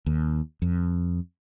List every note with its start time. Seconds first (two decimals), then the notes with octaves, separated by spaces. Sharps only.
0.06 D#2
0.62 F2